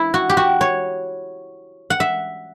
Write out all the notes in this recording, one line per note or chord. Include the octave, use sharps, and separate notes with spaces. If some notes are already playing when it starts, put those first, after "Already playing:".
Already playing: E4
F#4
G4
F#4
C#5
F#5
E5